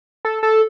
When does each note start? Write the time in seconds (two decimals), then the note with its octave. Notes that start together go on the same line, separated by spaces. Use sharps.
0.25 A4
0.43 A4